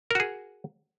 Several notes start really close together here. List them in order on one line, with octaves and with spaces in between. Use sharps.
A#4 F#4 G#4